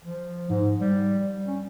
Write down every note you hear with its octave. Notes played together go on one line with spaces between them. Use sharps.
F3
G#2
G3
C#4